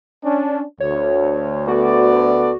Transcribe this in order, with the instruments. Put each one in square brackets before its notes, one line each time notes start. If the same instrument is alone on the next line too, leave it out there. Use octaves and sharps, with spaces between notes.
[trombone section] C#4 D4
[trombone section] D2 [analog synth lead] C#5
[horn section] B3 A4 D5 [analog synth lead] F#4